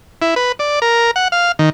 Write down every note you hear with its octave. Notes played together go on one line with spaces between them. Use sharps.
E4
B4
D5
A#4
F#5
F5
D#3